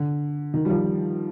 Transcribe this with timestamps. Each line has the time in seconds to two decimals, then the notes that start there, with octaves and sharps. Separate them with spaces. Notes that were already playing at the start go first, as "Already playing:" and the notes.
Already playing: D3
0.54 D#3
0.65 G3
0.69 F3